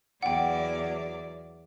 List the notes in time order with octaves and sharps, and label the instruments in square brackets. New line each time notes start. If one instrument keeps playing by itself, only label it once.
[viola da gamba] E2 F#3 D5 [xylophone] F#5 G5